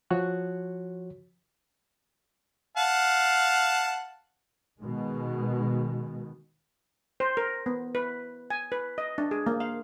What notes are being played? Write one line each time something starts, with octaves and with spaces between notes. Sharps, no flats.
F3 F#4 C#5 F#6
F5 F#5 A5
B2 D#3 G#3
C5
A#4
B3
B4
G#5
B4
D#5
D4
G#4
A#3
F5